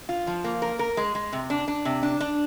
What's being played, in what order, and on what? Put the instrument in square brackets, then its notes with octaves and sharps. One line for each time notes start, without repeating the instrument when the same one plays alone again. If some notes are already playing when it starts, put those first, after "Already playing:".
[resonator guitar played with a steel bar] F4
F3
A#3
A#4
A#4
G#3
G#3
C3
D4
D4
C3
D4
D4